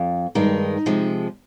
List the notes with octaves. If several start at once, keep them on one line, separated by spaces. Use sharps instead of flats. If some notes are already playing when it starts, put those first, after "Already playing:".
Already playing: F2
G2 D#3 G#3 D#4
C3 F3 G#3